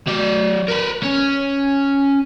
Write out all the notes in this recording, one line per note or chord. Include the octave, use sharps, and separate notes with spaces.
F#3 D5
A#4 B4
C#4